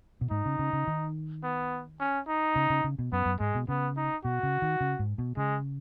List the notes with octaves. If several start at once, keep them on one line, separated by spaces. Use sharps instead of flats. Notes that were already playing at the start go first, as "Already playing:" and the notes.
B2
G#2 D#4
C#3
C#3
C#3
D#3
B3
C#4
D#4
C#3
C#3
C#3
B2
F#2 B3
F#2
G#2 G#3
B2
C#3 B3
D#4
B2 F#4
C#3
D#3
C#3
G#2
B2
C#3 G#3